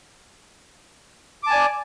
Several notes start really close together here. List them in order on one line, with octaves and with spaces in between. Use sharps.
D6 A5 G#5 D5